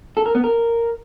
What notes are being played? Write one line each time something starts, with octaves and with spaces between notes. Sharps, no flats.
A4
A#4
B3
A#4